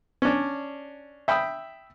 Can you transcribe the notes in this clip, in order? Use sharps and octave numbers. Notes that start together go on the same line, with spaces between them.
C#4 D4
E5 G5 B5 D#6 E6